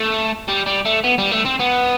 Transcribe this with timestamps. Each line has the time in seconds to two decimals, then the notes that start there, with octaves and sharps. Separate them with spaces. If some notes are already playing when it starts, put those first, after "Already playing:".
Already playing: A3
0.48 G3
0.66 G3
0.86 A3
1.04 B3
1.19 G3
1.32 A3
1.45 C4
1.60 B3